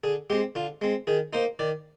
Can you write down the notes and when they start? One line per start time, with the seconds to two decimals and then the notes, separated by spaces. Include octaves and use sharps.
0.04 D3 G#4
0.30 G#3 C4 G4
0.55 D3 F4
0.81 G#3 C4
1.07 D#3 G#4
1.33 A#3 D#4 C5
1.59 D#3 D5